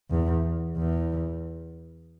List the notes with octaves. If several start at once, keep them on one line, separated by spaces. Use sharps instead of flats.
E2
E2